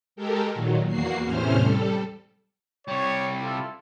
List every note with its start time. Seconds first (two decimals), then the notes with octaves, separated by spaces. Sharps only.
0.16 G#3 G4 A4 A#4
0.54 A#2 D#3 F#3
0.87 E2 A#3 F#4 C7
1.24 E2 A2 C3 C#4 C5 F6
1.60 G3 A4
2.88 C2 G3 C#5
3.43 E4 F4 A4